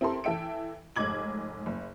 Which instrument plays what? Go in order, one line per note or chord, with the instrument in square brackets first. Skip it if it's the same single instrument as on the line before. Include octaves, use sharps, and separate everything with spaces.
[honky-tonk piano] C4 E4 G4 A4 A#4 C6
E3 A4 E5 G5 D7
F1 G#2 D#5 D6 G#6 F#7
F#1